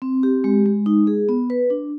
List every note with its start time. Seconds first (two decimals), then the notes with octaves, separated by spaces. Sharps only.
0.02 C4
0.23 G4
0.44 G#3
0.66 G#3
0.86 D#4
1.07 G#4
1.29 B3
1.50 B4
1.70 D4